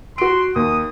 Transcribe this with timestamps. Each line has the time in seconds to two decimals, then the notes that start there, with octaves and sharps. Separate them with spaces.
0.18 F#4 C6 D7
0.56 D#2 D#6